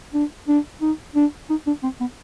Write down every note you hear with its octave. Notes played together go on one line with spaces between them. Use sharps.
D4
D4
D#4
D4
D#4
D4
C4
B3